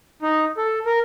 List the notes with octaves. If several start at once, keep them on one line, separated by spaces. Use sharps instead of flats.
D#4
A4
A#4